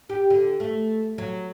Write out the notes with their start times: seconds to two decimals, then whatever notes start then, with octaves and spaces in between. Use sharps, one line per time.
0.10 G4
0.30 D3
0.60 A3
1.18 F#3